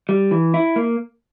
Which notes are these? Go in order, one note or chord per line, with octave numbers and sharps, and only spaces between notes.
G3
E3
E4
A#3